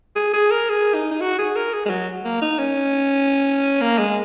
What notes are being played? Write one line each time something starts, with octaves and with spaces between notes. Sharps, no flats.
G#4
G#4
A#4
G#4
D#4
D#4
F#4
G#4
A#4
G#4
G#3
F#3
A#3
D#4
C#4
A#3
G#3